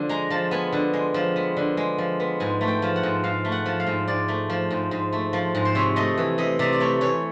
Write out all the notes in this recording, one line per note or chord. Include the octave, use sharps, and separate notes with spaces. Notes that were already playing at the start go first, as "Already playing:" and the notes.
Already playing: D3 F3
G#3 A#5
F3 A5
B3 G#5
D3
G#3
F3
B3
D3
G#3
F3
B3
G#2 G#5
A3
G5
F3
F#5
G#2
G#2 F5
A3
F#5
F3
F5
G#2
G#2 D5
A3
F3
G#2
G#2
A3
F3
G#2
C5
C3 C#5
A3 D#5
E3
C3 D#5
C3 D5
D5
A3 C#5
E3 C#5